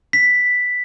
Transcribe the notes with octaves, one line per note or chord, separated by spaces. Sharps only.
B6